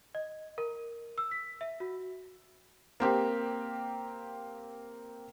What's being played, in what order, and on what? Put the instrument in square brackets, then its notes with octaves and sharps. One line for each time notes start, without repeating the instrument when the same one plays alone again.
[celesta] D#5
A#4
E6
B6
E5
F#4
[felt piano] A#3 C4 G4